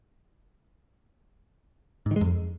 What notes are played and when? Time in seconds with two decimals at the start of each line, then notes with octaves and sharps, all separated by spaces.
2.06 G#2
2.11 D#3
2.16 G#3
2.21 F2